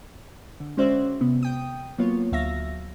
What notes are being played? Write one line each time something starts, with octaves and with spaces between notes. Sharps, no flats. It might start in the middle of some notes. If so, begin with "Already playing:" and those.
D3
G#3 C#4 F#4 C5 D5 E5
C3 B3
G5 D#6
F#3 A#3 B3 F4 C#5
D2 F#3 E5 F5 A#6